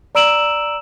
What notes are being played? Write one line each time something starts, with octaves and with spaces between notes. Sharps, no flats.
D5 A#5 E6 D7 E7 F#7